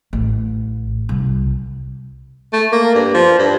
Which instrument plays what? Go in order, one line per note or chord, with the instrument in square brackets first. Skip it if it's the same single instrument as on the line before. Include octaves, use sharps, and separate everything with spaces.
[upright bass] A1
C2
[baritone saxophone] A3
A#3
G2
F3
G2